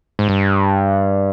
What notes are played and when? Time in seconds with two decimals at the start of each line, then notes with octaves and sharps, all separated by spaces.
0.19 G#2
0.29 G2